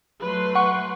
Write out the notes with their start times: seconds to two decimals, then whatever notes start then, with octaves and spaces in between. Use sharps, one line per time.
0.21 F#3 A3 B4 C6
0.55 F#5 C#6